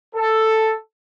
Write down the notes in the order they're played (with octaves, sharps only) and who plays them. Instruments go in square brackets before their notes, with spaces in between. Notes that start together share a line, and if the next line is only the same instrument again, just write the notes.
[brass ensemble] A4